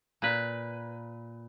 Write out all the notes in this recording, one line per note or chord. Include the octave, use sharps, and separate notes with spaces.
A#2 B4